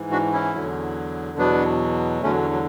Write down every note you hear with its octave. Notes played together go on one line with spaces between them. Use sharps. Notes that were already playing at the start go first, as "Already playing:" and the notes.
Already playing: G#2 E3
D4 F#4
C#4 E4
E2 D3 F#3
E2 B2 F#3 B3 D4
E2 D3 F#3 A3 C#4
F#3